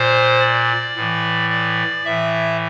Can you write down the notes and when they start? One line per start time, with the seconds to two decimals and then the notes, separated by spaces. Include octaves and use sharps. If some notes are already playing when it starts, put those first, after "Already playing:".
Already playing: A#2 C5
0.40 D5
0.95 A2 E3
1.50 D5
2.05 A2 E3 E5